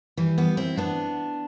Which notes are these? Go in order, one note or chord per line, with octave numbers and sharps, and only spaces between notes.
E3 G3
G3 B3
C4 E4
B3 D4